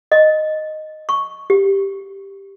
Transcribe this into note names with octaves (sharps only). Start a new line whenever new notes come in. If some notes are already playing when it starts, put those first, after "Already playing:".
D#5
C#6
G4